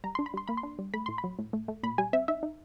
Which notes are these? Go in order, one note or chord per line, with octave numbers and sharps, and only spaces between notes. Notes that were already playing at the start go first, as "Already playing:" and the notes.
G3 A#5
D4 C6
B5
G3 C6
A#3 B5
C6
D4
G3
A3 B5
A2 C6
B5
F#3
A2
A3
A3
A#2 B5
G3 G#5
C4 E5
D#4 E5
D#4